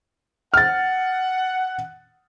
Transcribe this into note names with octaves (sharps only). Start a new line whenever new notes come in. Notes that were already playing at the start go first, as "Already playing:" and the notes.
F#5 F6 A6